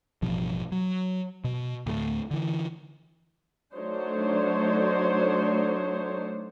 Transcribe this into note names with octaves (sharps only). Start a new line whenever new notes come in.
A1 G2 B2 F3
F#3
B2
D2 A2 F#3 A3
D3 E3
F#3 A3 D4 D#4 C5 C#5